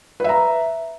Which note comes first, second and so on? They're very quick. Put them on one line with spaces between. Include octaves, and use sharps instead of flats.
B4 E5 A#5